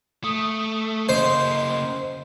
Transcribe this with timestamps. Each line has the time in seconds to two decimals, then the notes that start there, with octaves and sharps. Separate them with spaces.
0.24 A3 D#6
1.09 C#3 A#3 C5 D#5